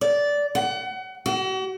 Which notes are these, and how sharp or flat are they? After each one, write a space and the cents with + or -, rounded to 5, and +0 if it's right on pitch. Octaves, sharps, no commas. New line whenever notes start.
D5 -15
F#5 +30
F#4 +40